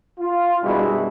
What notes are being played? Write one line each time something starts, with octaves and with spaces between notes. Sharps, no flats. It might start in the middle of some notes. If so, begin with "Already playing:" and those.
F4
F#2 B2 G3 G#3 D4 E4